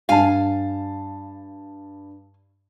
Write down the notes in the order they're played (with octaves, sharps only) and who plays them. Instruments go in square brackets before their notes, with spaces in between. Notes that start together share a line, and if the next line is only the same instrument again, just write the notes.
[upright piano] G2 A5 [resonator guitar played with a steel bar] F5 G#5